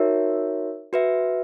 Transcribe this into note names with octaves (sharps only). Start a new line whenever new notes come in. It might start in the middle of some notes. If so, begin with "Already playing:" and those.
Already playing: D#4 F#4 A#4 C#5 E5
F#4 B4 E5